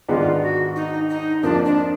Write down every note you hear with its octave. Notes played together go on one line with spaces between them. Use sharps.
G#2 D#3 G#3 B3 D4 F4
F#4
D#4
D#4
F2 F3 A#3 D4 F4
D4